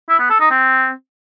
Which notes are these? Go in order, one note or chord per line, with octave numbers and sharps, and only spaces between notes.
E4
B3
A4
D#4
C4